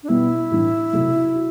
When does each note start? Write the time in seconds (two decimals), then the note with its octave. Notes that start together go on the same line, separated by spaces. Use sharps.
0.03 D4
0.08 B2 G3 B3 E4
0.51 A2 E3 G3 D4
0.93 C3 F#3 A3
1.36 F#4